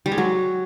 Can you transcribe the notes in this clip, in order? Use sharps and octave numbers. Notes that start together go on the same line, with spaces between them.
G3
G#3
F#3